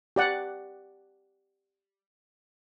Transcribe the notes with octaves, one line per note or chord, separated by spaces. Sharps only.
G4 D5 F#5